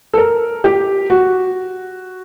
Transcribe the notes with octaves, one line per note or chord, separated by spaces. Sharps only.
A4
A#4
G4
F#4